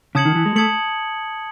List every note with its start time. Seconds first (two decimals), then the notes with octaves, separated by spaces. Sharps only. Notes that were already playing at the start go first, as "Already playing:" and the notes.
0.15 C#3 A5 D#6 G#6 C#7 F#7
0.25 D#3
0.35 E3
0.46 G#3
0.56 A3 A5 D#6 G#6 C#7 F#7